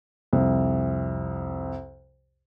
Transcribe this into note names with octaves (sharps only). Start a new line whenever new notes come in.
C2 F2